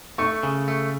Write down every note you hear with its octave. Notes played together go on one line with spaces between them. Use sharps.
A3 C#6
C#3
A3